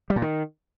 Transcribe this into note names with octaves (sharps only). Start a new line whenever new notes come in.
G3
A#2
D#3